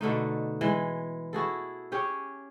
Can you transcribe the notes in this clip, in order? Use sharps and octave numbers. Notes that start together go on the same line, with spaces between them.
B2 D3 A3 D#4
E3 G#3
E4 F#4 G#4 A4
C#4 G4 G#4 C#5